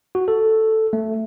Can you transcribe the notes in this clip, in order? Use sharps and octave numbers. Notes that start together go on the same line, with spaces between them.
F#4
A4
A3